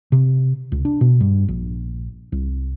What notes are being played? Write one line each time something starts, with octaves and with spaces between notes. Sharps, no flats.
C3
C#2
D4
B2
G2
A#1
C2